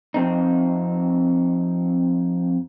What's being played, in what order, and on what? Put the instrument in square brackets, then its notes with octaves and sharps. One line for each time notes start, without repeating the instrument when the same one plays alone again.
[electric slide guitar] F2 C4 D#4